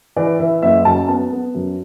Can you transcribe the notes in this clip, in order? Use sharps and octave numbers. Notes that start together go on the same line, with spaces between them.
E3 D5
E3 E5
F#1 E5
F#2 A5
B3 A5
B3
F#2